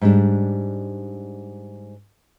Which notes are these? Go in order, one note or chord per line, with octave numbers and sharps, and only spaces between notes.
G#2 G3 D4